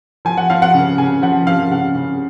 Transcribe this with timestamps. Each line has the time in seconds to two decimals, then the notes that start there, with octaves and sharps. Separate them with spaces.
0.25 F3 G#5
0.37 F#5
0.50 F3 F5
0.62 F#5
0.74 C#3
0.98 C#3 G#5
1.22 F3 F#5
1.47 F3 F5
1.71 C#3 F#5
1.95 C#3